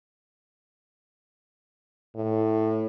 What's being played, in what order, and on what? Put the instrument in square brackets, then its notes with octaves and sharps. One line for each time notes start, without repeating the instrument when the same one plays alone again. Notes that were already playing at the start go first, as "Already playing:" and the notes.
[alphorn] A2